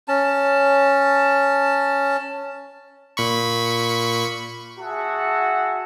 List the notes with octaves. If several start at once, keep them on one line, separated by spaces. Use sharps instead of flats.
C#4 A5
A#2 B5 C#6
F#4 G#4 E5 F#5 A5